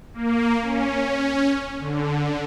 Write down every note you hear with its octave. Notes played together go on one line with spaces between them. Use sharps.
A#3
C#4
D3